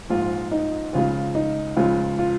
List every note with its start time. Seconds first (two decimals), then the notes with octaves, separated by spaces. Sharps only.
0.09 A#1 G#2 F3 F4
0.51 D#4
0.93 C#2 C#3 F3 F4
1.35 D#4
1.77 C#2 C#3 F3 F4
2.19 F4